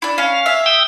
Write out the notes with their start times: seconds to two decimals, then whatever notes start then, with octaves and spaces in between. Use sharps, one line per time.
0.02 D4 E4
0.18 C#4 F5
0.46 E5
0.66 G5 D#6 E6